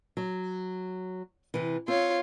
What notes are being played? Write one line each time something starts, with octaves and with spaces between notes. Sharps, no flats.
F#3
C3 E3
C4 F4 C#5